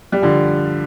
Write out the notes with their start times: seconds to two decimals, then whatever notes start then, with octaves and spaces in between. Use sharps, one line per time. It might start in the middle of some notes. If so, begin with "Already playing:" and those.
0.12 G3
0.22 D3 F3